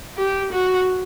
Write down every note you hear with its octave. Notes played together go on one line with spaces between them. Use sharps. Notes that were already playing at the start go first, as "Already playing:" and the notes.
G4
F#4